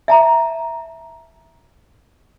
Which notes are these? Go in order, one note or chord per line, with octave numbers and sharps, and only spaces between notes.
E5 A5 A#5